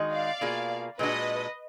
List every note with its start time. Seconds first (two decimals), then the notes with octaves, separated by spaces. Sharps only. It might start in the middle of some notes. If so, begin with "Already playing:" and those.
Already playing: D#3 G#3 D#4 F#4
0.12 D5 F5
0.41 B2 A#3 F4 G#4
0.99 A#2 G#3 D4 F#4 B4 D#5